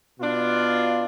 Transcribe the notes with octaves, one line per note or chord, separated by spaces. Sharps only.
B2 D4 F4